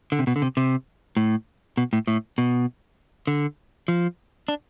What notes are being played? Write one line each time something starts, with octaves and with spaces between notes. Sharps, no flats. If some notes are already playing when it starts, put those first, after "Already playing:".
D3
C3
B2
D3
C3
C3
A2
B2
A2
A2
B2
D3
F3
D4